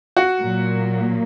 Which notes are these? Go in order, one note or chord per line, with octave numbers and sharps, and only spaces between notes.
F#4
A#2 F#3 A#3